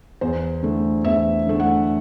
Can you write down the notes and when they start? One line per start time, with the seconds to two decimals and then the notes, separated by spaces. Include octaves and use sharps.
0.21 E2 C5
0.63 D3 A3
1.04 E2 E5
1.47 D3 A3
1.60 F#5